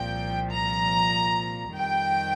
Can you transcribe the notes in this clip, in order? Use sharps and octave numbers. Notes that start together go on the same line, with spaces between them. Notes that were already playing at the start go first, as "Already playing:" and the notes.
Already playing: C2 A#2 F3 G5
A#5
F2 D#3 G3 G5